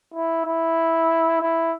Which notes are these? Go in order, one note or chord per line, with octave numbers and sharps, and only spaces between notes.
E4
E4
E4